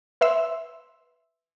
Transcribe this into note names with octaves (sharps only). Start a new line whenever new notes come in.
B4 E5 C6 E6